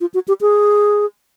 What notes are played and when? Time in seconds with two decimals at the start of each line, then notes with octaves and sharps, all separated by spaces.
0.01 F4
0.14 F#4
0.28 G4
0.41 G#4